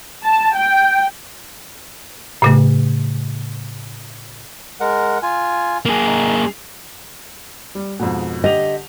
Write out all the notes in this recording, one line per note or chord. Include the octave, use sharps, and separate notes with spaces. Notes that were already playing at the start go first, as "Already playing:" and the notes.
A5
G5
A2 C#3 A3
G#3 A#4 F#5
F4 G#5
A#3 G#4
D#4
G3
F2 G#2 B2
D3 G4 D#5 F7